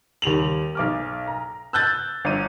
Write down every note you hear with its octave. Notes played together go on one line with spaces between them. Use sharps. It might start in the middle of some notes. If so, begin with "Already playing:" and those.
D#2 G3 F7 F#7
B1 D6 F6
A#5
E6 F#6 G6 A6
G1 D#7